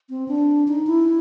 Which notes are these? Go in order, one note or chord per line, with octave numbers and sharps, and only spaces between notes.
C4
D4
D#4
E4